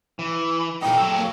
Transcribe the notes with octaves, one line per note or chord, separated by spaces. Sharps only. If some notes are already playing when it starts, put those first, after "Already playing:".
E3
A#2 D#4 G5
F#3 A4
A#3